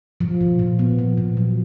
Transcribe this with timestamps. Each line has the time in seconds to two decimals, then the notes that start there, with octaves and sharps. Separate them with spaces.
0.21 F3
0.41 A#2
0.59 A#2
0.79 B3
0.99 F3
1.17 A#2
1.37 F#3